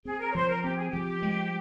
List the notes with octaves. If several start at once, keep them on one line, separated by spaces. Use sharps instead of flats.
C4 G#4
A#4
C#5
F3 C5
A#4
C4 G4
G#4
F3 G4
G#3